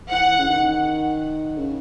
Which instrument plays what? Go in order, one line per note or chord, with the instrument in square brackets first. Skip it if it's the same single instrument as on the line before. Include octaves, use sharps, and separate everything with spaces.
[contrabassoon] E3 [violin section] F#5
[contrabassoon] C#3
D#3
C#3